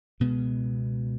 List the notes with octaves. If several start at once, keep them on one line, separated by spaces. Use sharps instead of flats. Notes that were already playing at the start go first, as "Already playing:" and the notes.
C#2 B2 G#3 B3